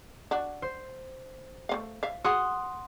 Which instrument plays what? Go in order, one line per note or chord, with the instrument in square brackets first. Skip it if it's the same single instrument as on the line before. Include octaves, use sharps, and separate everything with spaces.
[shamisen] D4 F#4
[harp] C5
[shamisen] A3 C4 F5
E5 F5
[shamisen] F#4 G#4 [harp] F#5 C6 D#6